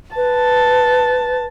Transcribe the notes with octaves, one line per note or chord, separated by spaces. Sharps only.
B4 A5